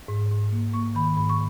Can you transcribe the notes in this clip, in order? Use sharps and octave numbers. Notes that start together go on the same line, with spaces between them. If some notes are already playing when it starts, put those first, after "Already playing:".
G#2
G#2
A#3
A#3 C#6
D#3 B5
G#2 B5
C#6